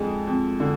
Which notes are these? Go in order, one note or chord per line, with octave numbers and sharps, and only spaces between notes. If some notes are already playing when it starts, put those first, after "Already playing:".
Already playing: F2 D3 G#3
F2
D3